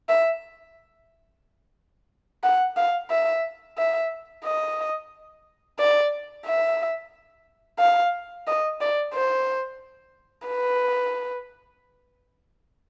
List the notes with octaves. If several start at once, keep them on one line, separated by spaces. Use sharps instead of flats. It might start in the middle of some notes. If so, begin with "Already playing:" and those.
E5
F#5
F5
E5
E5
D#5
D5
E5
F5
D#5
D5
C5
B4